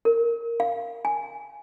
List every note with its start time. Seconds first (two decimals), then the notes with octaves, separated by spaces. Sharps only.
0.05 A#4
0.60 F5
1.05 G#5